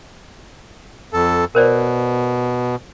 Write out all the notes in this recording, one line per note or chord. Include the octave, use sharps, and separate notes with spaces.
F2 A4
B2 A#4 C5 D5